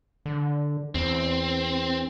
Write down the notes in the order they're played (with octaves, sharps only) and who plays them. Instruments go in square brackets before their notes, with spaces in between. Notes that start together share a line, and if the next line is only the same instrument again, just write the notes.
[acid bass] D3
[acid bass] E2 [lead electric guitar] C4